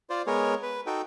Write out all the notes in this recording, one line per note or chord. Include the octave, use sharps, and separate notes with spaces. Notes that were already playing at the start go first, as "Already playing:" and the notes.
F4 C5 D5
G#3 B3 G#4 A#4 C#5
B4
D#4 F#4 A4 G5